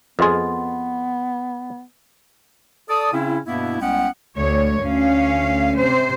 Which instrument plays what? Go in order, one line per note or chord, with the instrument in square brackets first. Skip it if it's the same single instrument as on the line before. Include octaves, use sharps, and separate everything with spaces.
[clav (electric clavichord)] F2 G#4 [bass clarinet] B3 [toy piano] B4 D#5 C6
[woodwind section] A4 D5 D#6
C#3 C4 C#4 E4
G2 B2 A#3 B3 E4
C2 G#3 B3 C#4 F#5 G5
[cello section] D2 C#5
D2 C#4 F5
C3 C5